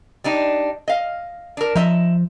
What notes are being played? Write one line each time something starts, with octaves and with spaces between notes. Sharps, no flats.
G3 D4 D#4
D#5 F5
D4 A#4
F3 D#5 E5 A#5